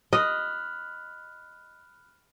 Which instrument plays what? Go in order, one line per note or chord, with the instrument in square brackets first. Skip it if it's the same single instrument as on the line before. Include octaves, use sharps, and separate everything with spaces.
[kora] D#5 [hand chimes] B5 F6 F#6